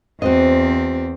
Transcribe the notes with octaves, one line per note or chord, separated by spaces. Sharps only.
E2 C4 F#4 C5 D#5